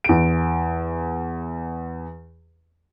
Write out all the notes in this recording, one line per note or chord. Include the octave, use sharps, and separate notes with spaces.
E2 D7